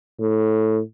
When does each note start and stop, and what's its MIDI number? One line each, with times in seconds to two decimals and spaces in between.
0.20 0.79 45